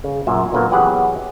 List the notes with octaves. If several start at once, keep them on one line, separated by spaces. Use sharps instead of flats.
C#3
F#2 A#2 E5
A#2 D3 F#3 A#3 B3
E2 F#3 G4 G#4 B4 F#5